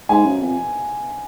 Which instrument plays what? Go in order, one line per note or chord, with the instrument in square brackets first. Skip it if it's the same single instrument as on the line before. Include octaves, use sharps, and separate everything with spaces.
[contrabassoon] G#2 [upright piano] G#5
[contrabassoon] F#2
F2